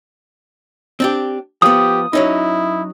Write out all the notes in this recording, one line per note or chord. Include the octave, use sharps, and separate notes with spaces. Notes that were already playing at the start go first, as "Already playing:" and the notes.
C4 D4 G4
F3 B3 G4 D#6
F#3 C#4 D#4 E4